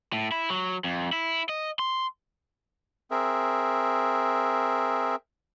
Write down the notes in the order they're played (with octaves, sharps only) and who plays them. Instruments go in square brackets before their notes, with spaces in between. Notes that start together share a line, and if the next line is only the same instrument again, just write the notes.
[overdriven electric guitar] A2
E4
F#3
F2
E4
D#5
C6
[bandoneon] C4 G#4 A#4 E5